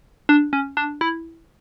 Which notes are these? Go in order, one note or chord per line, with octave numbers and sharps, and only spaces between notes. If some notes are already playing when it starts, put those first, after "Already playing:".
D4
C#4
D4
E4